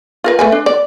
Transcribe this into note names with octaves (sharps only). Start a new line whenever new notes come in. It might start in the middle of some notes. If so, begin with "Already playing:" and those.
F4 A#4 B4
A3 B4 G#5
D4
D5